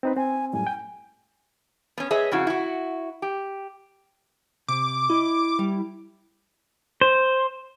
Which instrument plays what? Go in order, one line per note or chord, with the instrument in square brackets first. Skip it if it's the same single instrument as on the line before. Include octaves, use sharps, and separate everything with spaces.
[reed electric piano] C4 D#4 B4
[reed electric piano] C4 [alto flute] G#5
[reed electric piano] F#2 A2 G3 [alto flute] G#5
[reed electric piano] G5
[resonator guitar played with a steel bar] B3 C#4
G#4 B4 C#5 D#5 E5
F2 C#3 E4 F#4
E4 F#4
G4
[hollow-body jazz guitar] C3 [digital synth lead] D6
[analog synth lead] E4 [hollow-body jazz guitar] D#5
[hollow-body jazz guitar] G3
[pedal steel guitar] C5